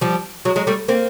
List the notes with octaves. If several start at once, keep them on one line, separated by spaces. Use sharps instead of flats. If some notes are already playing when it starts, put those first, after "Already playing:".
F3 G3
F#3 G#3
F#3 G#3
G3 A3
A#3 C4